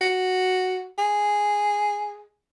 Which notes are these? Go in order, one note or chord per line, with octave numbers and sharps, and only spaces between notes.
F#4
G#4